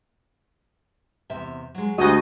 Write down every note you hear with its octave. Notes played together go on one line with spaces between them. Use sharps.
E2 C3 E5
F#3 G#3
D2 G#3 F#4 G4 D#5